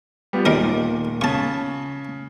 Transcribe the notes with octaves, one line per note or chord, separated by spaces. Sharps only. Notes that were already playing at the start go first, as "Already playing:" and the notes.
G3 B3 F4
D#1 A#2 D#3 G3 A#4
C#3 A5 C#6